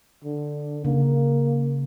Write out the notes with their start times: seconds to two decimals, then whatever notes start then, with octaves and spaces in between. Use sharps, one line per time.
0.24 D3
0.85 C#3 A#3